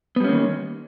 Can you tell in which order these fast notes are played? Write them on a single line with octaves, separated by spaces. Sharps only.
B3 G3 C#4 A#3 D#3